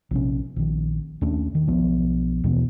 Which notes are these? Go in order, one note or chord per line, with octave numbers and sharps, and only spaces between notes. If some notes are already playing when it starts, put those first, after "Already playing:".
A#1 C3 C#4
A#1 D#3
D#2 A3 C#4 D4
D#3
B1 F3 B3
D#2 B2 E3 B3